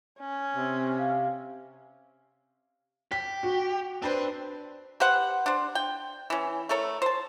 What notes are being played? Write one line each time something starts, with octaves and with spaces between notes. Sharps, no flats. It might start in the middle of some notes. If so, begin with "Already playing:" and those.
C#4
C3 C4
F5
G4 B6
F#4
C4 D4 B4 C5
G4 B4 C5 F#5
D4 C5
G5
E3 C#4
A3 A4 A#4 C#5
C5 A5